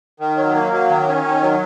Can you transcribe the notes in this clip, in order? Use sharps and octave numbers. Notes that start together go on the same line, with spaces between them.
D#3
F#3
A#3
F#3
D#3
C#4
D#3
F#3